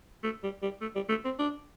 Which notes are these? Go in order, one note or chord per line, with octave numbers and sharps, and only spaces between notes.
A3
G3
G3
A3
G3
A3
C4
D4